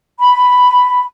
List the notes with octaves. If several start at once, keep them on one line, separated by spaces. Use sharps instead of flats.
B5